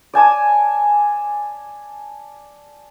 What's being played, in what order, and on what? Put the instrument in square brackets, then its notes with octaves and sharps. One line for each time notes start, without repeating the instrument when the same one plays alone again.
[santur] D5 G#5 A5 D6